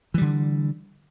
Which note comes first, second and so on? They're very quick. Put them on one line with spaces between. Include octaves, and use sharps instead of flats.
E3 G3 D3